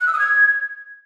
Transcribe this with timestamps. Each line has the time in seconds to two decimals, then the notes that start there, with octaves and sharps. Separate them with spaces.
0.01 F#6
0.07 E6
0.13 D#6
0.19 G#6